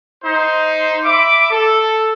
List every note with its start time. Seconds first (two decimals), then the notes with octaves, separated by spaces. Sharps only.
0.25 D#4 C5
1.05 E5 B5 D6
1.51 A4